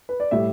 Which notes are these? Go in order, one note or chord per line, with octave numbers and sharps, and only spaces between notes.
B4
D5
A2 G3 E5